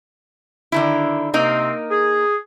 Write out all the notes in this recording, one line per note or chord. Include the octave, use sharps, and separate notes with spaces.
D3 D#3 E4
C3 A#3 C4 D#4 A#4
G#4